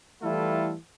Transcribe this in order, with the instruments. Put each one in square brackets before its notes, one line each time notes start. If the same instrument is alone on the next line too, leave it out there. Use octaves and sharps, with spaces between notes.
[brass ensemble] E3 G3 A3 E4 F4 A4